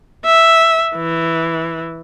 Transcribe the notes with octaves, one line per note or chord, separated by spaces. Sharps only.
E5
E3